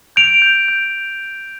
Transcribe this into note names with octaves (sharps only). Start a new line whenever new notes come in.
G6 D7 F7
G6
G6